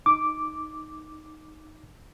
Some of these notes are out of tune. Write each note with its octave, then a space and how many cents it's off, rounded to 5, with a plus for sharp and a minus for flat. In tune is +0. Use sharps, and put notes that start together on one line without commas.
D#4 +0 D6 +0